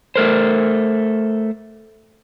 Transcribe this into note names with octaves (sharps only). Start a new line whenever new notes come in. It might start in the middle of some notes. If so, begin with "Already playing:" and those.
A3 A#4 C5